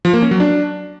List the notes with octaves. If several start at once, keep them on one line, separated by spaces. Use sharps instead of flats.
F3
A#3
C#4
F#3
D4